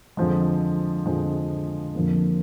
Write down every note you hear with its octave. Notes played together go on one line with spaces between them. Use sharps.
F2 D3 F3 G#3
F2 D3 F3 G#3
F2 D3 F3 A#3